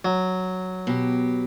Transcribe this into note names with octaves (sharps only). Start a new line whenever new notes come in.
F#3
B2 G4